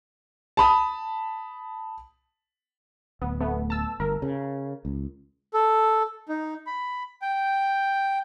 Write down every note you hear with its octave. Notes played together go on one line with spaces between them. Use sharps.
A5 B5 D#6
D1 B3
A3 B3
A5 E6
G1 A#4
C#3
C#2
A4
D#4
B5
G5